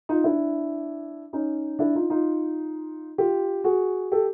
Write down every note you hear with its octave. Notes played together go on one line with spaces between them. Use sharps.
D#4 F4
D4 E4
C#4 D#4
D4 E4
D#4 F4
D#4 F4
F4 G4
F#4 G#4
G4 A4